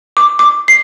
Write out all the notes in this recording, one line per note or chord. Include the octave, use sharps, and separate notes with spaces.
D6
D6
C7